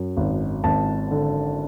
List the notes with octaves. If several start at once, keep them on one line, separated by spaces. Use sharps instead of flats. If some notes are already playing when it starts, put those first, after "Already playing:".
Already playing: F#2
G#1
G#1 A5
D3